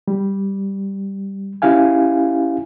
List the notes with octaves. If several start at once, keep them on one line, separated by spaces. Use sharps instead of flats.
G3
C#4 E4 G4 F5 G#5